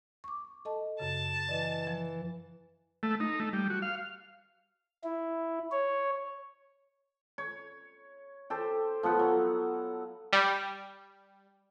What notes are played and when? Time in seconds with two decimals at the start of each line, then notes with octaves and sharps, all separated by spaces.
0.24 C#6 D6
0.65 A4 D#5 A5
1.00 F#2 C#3 A5
1.49 E3 D5 D#5
1.87 F3
3.03 A3
3.20 D#4
3.40 A3
3.53 G3
3.70 F#4
3.82 F5
5.04 E4
5.72 C#5
7.38 C#5
8.50 G4 A4 C5
9.03 F3 B3 A4 F#5
9.19 F#3
10.33 G3